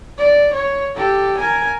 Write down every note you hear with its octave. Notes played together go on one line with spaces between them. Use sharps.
D5
C#5
G4 A4
A#4 G#5